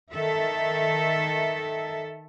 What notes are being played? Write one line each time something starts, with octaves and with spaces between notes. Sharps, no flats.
D#3 A4 E5